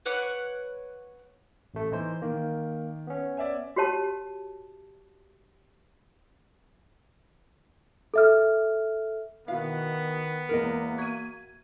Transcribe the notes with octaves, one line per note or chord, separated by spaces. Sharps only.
B4 C#5 F#5 D6
A1 A3
E3 D#4 C5
D#3 A#3
B3 C#4
D5 E5 G#5
F#4 G4 C#5 A5
A4 E5 F6
B2 D#3 B3 E4 F5
E2 E3 G#3 A#3 A#4 D#5
F#4 E5 G#6 D#7